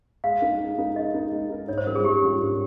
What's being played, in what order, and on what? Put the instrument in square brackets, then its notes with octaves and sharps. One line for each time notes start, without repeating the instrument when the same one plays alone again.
[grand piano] G#3 [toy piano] F5
[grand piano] D#4 A#4
G#3
D#4 A#4
[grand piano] G#3 [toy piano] D#5
[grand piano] D#4 A#4
G#3
D#4 A#4
[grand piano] G#2 [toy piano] C#5
[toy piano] C5
[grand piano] G3 C#4 F4 [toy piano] A#4
[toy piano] G#4
[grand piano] G#2 [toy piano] G4
[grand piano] G3 C#4 F4
G#2